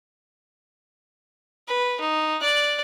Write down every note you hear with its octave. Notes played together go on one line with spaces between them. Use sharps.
B4
D#4
D5 F#6